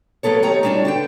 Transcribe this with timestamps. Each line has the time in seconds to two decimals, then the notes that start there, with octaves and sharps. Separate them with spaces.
0.23 F#3 A#3 B3 A4 C#5
0.43 D#3 D#4 G4 C#5 A#5
0.63 G3 C#4 D4 E4 F#4
0.85 D3 B3 G5